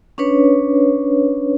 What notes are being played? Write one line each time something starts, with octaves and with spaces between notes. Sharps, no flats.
C#4 D4 B4 C#5